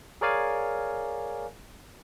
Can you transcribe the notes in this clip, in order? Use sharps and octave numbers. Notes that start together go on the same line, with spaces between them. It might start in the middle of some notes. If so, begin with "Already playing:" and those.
G#4 A#4 C#5 D5 F5 G#5